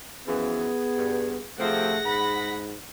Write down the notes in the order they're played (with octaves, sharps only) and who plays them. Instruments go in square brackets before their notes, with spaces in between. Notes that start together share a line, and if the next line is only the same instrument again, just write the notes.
[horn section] F#2 E3 F3 [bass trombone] B3 [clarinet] G#4
[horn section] G2
[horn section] C3 F3 C4 [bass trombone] A3 [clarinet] G#4 [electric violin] F#5 A#6
[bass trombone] G#2 [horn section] B5